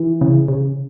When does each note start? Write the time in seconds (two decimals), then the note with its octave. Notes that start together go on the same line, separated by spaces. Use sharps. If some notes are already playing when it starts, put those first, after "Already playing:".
Already playing: E3
0.21 C#3
0.48 C#3